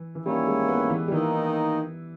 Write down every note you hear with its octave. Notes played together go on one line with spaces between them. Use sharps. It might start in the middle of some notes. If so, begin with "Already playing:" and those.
Already playing: E3
E3
D#3 G3 A#3 C#4 E4
G#3
B3
E3
G3
D#3 E3 A#3 D#4